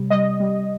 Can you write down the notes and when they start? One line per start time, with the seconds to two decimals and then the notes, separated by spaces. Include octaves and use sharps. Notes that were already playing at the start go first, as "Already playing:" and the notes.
Already playing: C3 G3
0.10 G3 D#5
0.40 G3